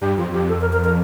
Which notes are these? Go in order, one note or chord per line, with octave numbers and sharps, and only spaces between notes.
G2 G4
F2 F4
F2 G4
A4
A#4
A#4
A#4